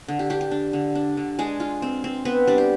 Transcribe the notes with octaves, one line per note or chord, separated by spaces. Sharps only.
D3
G4
D4 G4
G4
D4
D3
D4
D3
G#3 D4 G#4
F4
C4
C4
B3 C4 B4
G3 D4 D5
G4